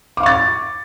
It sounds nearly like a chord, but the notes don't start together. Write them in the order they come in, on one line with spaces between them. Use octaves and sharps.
D6 F5 C#6 A6